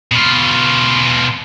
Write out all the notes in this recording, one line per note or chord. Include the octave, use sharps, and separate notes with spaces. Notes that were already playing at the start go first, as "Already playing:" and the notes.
B2 F4